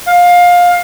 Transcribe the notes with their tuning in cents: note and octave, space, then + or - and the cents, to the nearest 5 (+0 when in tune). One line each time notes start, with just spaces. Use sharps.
F5 +20